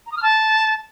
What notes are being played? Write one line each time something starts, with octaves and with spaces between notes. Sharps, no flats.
A#5
D#6
F6
A5